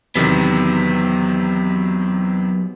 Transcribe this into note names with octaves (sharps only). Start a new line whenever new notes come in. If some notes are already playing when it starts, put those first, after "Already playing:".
E2 C3 D#3 F#3 B3